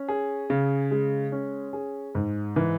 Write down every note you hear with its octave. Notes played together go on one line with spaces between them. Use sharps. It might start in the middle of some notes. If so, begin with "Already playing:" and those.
Already playing: C#4
G#4
C#3
G#3
C#4
G#4
G#2
E3